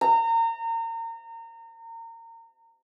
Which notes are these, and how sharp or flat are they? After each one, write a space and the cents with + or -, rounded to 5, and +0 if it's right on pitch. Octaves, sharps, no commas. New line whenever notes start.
A#5 -30